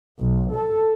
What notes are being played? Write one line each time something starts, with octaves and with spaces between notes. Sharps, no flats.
B1
A4